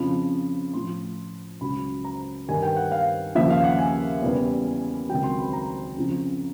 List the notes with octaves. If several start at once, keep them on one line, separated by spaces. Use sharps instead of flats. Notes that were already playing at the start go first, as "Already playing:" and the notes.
Already playing: F2 C#3 F3 B5
A2 F3 C6
C#2 C#3 F#3 B5
A#5
G2 D#3 G3 G#5
G5
F#5
F5
D#2 C#3 F3 E5
F5
F#5
G#5
E2 C#3 E3 G3
C#2 C3 D#3 F#3 G5
C6
B5
A#5
F2 C#3 F3